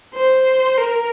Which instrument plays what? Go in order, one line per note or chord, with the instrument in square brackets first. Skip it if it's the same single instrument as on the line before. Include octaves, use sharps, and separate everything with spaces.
[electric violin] C5
A#4